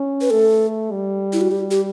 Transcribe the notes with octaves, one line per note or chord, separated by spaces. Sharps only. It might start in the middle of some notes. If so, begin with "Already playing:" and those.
Already playing: C#4
B4
A3 A4
G3
E4
F#4
G3 G4
G4